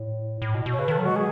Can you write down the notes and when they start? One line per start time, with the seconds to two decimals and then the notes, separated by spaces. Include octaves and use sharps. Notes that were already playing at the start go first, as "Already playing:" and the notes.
Already playing: A2
0.42 A2
0.54 B2
0.66 B2
0.73 C#5
0.79 C#3 B4
0.88 D#3 A4
0.98 F#3
1.04 G#3 F#4
1.16 G#4